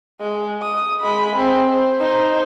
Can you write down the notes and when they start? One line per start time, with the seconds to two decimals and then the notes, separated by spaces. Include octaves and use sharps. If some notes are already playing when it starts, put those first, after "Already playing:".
0.20 G#3
0.62 D#6
1.01 G#3 B5
1.36 C4 G#4
1.70 C5
2.00 D#4 C5